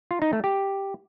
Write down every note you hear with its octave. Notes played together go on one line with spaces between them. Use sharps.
F4
D#4
A3
G4